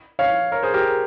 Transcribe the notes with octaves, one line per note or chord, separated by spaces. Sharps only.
C#5 F5
A#4 C#5
G#4 C5
G4 A#4